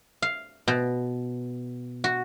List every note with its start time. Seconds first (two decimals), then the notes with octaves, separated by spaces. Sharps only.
0.22 F5
0.68 B2
2.04 F#4